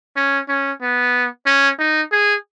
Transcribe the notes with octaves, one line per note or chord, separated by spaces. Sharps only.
C#4
C#4
B3
C#4
D#4
G#4